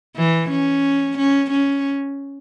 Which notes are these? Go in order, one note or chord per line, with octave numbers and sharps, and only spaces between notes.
E3
C#4
C#4
C#4